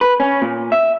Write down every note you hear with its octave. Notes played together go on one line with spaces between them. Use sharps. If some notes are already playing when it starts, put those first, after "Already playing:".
B4
C#4
A#2
E5